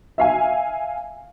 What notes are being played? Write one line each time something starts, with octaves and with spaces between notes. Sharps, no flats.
E5 F5 G#5